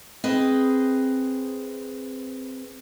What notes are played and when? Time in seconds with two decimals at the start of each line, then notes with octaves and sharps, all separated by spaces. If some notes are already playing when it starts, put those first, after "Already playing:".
0.24 C4 G#4 B4 D#5